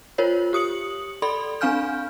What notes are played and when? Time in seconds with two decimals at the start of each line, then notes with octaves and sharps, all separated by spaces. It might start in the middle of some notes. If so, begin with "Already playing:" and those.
0.18 F4 A#4 C5 C#5
0.53 G4 D#6 C#7 F#7
1.22 A4 D5 B5 C6
1.61 C4 D4 F5 G#5 F6 G6